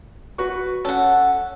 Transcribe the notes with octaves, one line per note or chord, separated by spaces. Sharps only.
F#4 B4 C#6
C#4 A4 F#5